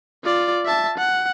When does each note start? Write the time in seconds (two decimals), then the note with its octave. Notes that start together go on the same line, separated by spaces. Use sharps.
0.24 F4 D5
0.66 E5 A5
0.98 F#5